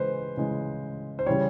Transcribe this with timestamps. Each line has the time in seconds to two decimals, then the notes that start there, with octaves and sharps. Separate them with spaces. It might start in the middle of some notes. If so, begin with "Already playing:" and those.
Already playing: C#3 E3 G#3 B4 C5
0.37 C#3 E3 G#3
1.19 C5
1.26 C#3 E3 G3 C#5